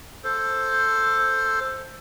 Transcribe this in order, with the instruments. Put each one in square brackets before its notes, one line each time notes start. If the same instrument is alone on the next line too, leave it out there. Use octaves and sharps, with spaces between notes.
[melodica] A4 C5